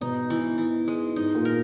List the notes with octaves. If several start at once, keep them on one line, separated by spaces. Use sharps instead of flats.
G#2 B2 D#4
E3
E3
G#3
G#2 D#4
A#2
A#4